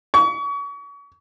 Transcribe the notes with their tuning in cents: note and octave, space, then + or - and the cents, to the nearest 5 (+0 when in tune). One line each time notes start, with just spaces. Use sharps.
C#6 +35